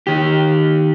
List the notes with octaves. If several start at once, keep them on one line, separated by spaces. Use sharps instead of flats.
D#3 G4